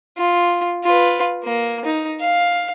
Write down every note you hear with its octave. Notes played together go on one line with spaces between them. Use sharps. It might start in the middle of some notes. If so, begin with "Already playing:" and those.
F4
F4 B4
A#3
D#4
F5